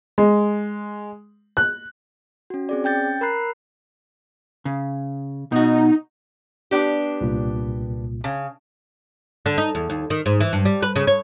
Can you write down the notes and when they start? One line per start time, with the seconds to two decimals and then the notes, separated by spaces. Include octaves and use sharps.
0.18 G#3
1.57 F#6
2.50 C#4 F#4
2.69 C4 G#4 D5
2.84 C#4 G5 G6 A6
3.21 A#4 A#5 B5 F#6 C7
4.65 C#3
5.52 B2 D#4 F#4
6.71 B3 D4 G4
7.21 C2 A#2
8.24 C#3
9.46 D3
9.58 D#4
9.75 E2
9.90 D#2
10.10 D#3
10.26 G#2
10.40 E3
10.53 G2
10.65 G3
10.82 B4
10.96 C#3
11.07 C#5